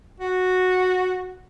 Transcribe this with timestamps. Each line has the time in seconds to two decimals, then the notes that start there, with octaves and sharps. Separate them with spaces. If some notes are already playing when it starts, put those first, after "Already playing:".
0.20 F#4